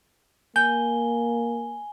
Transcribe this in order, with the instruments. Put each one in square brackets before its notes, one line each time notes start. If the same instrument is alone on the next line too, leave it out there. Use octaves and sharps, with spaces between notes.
[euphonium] A#3 [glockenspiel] G#5 G7 [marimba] G6